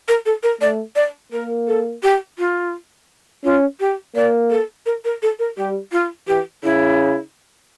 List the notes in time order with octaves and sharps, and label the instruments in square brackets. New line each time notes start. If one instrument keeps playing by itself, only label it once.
[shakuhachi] A#4
A4
A#4
[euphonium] A3 [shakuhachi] D5
[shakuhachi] D5
[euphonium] A#3 [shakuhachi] A#4
[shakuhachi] A4
G4
F4
[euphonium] C#4 [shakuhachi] F4
[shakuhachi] G4
[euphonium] A#3 [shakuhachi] D5
[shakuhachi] A4
A#4
A#4
A4
A#4
[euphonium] G3 [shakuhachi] G4
[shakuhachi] F4
[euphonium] E3 [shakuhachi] G4
[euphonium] C#3 [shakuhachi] E4